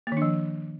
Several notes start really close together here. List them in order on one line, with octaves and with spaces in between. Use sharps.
A#3 D#3 D4 F3